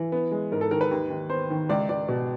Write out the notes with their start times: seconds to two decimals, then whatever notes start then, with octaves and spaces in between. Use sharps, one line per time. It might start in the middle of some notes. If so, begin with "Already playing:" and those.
Already playing: E3
0.12 B3
0.31 G#3
0.52 G#2 A#4
0.61 A4
0.71 D#3 A#4
0.81 B4
0.91 D#2
1.10 D#2
1.29 B3 C5
1.50 D#3
1.69 C#2 D5
1.89 C#2 D5
2.08 B2